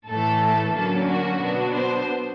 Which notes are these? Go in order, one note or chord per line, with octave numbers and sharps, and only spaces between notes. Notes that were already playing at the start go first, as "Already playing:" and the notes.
A2 E3 A3 A4
D3 F#3 A#3 C#4 A4
F#4
B2 F#3 B3 D4
C5